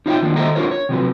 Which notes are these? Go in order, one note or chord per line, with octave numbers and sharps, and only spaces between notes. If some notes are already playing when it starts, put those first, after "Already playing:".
D#4 F4 C#5 E5 F5 G5
D#3 F3 A#3 D4
D#3 A4 C5 D#5 E5 A#5
D4 E4 F4 A#4 C5 C#5
C#5
C3 F3 F#3 B4